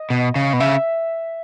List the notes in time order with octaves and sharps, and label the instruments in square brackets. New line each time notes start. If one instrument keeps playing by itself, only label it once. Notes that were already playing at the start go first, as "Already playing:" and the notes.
Already playing: [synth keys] D#5
[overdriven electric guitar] B2
C#3
B2
[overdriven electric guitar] C#3 [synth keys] E5